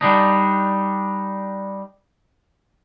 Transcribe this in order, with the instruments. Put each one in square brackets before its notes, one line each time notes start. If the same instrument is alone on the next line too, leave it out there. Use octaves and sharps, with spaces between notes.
[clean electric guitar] G3 D4 D#4